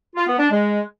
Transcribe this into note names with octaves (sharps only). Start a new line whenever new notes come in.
F4
B3
D4
G#3